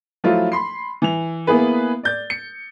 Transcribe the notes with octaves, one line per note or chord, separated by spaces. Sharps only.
F3 F#3 A3 E4 F4
B5 C6 C7
E3 F7
A#3 B3 E4 G#4 B4
D5 G6 A6
C#7